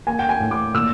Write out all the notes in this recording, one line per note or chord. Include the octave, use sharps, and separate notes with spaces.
A#3 G#5
G5
G#5
A2
D6
A#2 E6